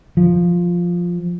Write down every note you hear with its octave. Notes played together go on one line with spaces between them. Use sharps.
F3